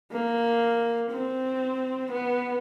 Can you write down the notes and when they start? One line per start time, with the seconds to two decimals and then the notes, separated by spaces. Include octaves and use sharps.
0.12 A#3
1.11 C4
2.12 B3